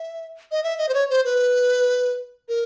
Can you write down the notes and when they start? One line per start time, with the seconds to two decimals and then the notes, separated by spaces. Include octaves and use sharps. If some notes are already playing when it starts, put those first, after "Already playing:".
Already playing: E5
0.52 D#5
0.64 E5
0.78 D#5
0.89 C5
0.94 C#5
1.10 C5
1.25 B4
2.49 A#4